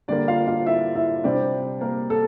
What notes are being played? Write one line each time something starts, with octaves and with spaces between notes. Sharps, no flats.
D3 G3 A#3 D4 D5
F4 F5
F4 F5
E4 E5
E4 E5
C3 G3 C4 D4 D5
A#3 A#4
A4